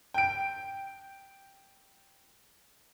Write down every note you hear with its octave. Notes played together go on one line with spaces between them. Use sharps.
G5 D7